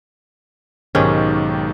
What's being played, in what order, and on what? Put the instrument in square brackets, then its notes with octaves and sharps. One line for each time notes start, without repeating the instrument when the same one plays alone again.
[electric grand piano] B1 D#3 G4 [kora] G#2 C#4